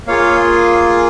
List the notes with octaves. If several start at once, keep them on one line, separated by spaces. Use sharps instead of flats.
A#3 F4 G#4 C#5 F5